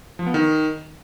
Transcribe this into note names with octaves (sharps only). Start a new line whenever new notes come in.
F3
B3
D#3